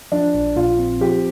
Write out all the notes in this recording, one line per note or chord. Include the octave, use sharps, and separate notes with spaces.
F3 D4
A#1
A#2 F4
C4
F3 G4